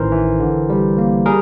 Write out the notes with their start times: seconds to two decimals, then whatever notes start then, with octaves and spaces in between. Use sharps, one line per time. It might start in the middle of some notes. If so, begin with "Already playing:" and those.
Already playing: A1 D#3 E3 A#4 C5
0.12 E3
0.40 D3
0.70 G3
0.98 A#3
1.26 G3 G#4 A#4